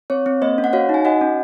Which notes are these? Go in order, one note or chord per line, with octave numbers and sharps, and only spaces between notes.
C4 C#5
C4
A#3 C5 D#5
C#4
F#5
F#4 C#5 F5
D#4
G#5
F#4 D#5 F#5
C#4